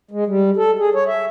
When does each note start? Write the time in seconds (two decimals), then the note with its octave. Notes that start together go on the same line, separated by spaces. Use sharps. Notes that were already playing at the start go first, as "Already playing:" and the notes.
0.11 G#3
0.27 G3
0.57 A4
0.79 G#4
0.95 C#5
1.07 E5